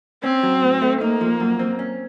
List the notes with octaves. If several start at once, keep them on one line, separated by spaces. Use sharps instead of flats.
C4 C#4
F#3
A2
A3
A#3 D#4
F3
F#2
C4
C#4